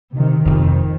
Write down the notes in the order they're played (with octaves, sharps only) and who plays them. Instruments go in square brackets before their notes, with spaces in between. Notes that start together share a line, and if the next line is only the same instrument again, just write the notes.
[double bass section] C3 D#3
[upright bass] F2 C3 [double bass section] D#3